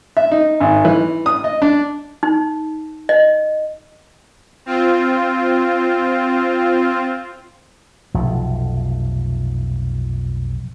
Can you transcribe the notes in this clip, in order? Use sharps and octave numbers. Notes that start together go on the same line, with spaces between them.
E5
D#4
G#1
E3
D#6
D#5
D4
D#4
D#5
C4 F4
F1 B1 F3